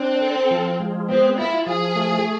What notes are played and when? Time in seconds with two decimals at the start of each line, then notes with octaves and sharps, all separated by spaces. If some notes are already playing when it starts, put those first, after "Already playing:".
Already playing: C4 D4
0.21 A4
0.51 F3
0.80 G#3
1.09 B3 C4
1.38 E4 F4
1.67 F3 G#4
1.96 A3